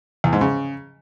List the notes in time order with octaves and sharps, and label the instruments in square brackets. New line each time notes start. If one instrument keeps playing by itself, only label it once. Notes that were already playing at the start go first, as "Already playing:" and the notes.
[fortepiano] E2
G#2
C#3